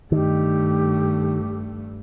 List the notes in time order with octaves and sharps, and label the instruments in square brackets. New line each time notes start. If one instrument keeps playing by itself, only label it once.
[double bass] G2 A3 [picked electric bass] D#3 [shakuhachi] G4